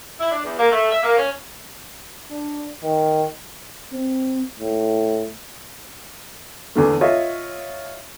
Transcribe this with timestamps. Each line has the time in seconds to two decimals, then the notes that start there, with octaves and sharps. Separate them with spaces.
0.19 E4
0.31 D4
0.44 E2
0.59 A#3
0.72 A3
0.91 E5
1.03 A#3
1.17 C#4
2.31 D4
2.83 D#3
3.92 C4
4.60 A2
6.75 E2 D3 A3
7.01 F4 C#5 D#5 E5